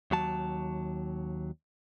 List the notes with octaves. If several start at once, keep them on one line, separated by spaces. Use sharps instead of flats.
D#2 F#3 A5